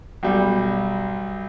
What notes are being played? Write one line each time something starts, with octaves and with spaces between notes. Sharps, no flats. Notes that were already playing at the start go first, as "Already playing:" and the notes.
B1 G3